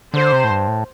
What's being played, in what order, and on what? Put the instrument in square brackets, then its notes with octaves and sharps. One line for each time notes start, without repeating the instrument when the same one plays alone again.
[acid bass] D3 [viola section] C5
[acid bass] C3
A2
G2
A2